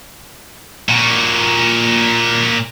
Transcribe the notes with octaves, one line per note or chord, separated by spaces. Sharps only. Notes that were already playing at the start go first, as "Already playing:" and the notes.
A#2 F#4